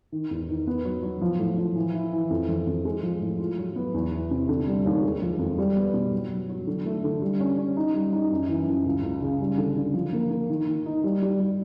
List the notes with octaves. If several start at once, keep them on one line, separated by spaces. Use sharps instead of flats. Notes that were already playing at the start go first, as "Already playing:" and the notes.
D#3
E2
D#3
B3
F#3
F#3
F3
A2
F3
E3
E4
E3
F2
F2
F2
G#3
F3
A2
F4
F#3
B3
E2
E3
C3
D3
G3
D#2
G#3
F3
F2
G3
B3
B2
F#3
F#3
F#3
D3
A3
D3
G3
C#4
C#4
D#4
G3
D#4
F#2
E3
F#2
C#2
C#2
C#3
G3
D3
D3
F3
A#3
A#3
D#3
D#3
D#4
G3
G3
G3